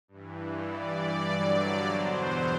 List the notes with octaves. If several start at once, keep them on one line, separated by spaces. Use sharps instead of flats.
G2 E3
G2 E3 D5
G2 D3 F#3
E2 B2 F#3 C5